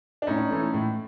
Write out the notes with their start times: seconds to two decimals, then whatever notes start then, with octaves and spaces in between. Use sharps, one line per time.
0.22 D4
0.27 A2 C#4 D#4
0.51 E3 A3
0.73 A2